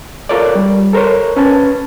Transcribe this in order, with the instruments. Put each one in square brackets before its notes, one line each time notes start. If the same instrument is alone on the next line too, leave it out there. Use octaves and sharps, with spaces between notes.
[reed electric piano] F4 A4 A#4 C#5 D5
G3
A4 A#4 C5 C#5
C#4 B4 A5